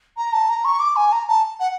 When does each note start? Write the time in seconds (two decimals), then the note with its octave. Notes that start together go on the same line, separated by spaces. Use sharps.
0.17 A#5
0.32 A5
0.49 A#5
0.64 C#6
0.79 D6
0.96 G#5
1.12 A#5
1.28 A5
1.60 F#5